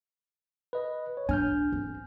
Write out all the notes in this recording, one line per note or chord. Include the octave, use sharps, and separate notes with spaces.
B4 D#5
C#5
D4 G#5 F6 G6
C4